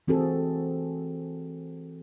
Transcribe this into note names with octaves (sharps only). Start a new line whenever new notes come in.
E3 C4 F#4 G#4 A4